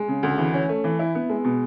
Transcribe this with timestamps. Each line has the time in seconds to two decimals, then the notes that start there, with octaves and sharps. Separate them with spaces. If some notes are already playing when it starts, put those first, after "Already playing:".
Already playing: G#3
0.08 C#3
0.23 D2
0.38 E3
0.54 C#4
0.69 A3
0.84 E3
0.99 E4
1.15 B3
1.30 G#3
1.45 B2